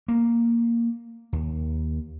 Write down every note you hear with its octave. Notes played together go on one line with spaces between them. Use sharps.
A#3
D#2